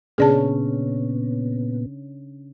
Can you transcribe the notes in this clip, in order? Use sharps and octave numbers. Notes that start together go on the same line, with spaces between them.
A#2 C#3 B3 C#4 D4 G#4 D5 A5